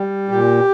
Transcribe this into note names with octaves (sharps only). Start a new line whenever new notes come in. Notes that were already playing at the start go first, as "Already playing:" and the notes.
Already playing: G3
A#2 G4